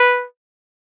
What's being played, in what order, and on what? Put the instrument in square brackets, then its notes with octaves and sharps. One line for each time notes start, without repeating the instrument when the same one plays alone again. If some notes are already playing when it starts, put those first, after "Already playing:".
Already playing: [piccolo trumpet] B4